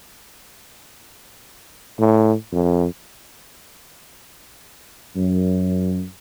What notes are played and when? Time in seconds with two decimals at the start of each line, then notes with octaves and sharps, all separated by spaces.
1.99 A2
2.52 F2
5.15 F#2